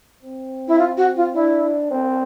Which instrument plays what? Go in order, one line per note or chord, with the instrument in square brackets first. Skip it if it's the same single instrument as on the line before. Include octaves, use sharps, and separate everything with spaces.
[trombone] C4
[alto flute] E4
F4
F#4
F4
[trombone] D4 [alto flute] E4
[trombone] C4